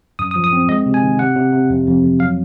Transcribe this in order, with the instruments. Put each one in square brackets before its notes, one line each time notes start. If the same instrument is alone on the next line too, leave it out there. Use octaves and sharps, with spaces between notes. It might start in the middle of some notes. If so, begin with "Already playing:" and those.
[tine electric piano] F#2 D#6
D#6
F3
D#6
C4
G#3 D#5
C3
G#5
D#3
C3 F#5
C3
C3
F2
F2
F2
F#3 F5